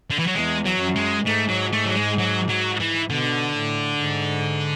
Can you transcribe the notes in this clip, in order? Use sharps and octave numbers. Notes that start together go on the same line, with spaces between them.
D3
E3
F#3
E2 G#3
F#3
F#2
G#3
G#2 A3
F#3
A3
F#3
G#3
F#3
F#3
E3
B2 D3
A2
G#2